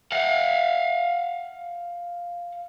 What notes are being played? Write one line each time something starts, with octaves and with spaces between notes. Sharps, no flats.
F5 F#5